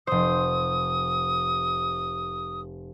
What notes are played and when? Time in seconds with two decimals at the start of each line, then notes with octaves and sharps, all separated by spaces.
0.07 F1 C5 D#6